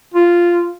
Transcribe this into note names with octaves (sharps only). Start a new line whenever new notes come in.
F4